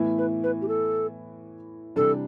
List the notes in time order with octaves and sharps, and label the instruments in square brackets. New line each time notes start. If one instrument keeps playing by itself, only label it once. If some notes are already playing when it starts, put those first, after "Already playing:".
Already playing: [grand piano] A2 E3 B3 E4
[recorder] B4
B4
G4
A4
[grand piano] C3 E3 G3 D4 [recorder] A4